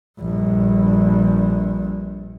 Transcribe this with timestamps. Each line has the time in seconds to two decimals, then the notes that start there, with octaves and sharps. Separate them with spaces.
0.19 A#1 G2